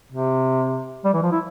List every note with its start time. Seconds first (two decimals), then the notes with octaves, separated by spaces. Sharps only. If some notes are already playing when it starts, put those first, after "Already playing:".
0.12 C3
1.04 G3
1.13 E3
1.23 F3
1.32 E4